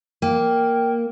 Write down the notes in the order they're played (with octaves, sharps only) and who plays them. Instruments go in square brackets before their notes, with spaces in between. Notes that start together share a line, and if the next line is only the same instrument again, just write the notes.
[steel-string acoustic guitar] A#3 [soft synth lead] G5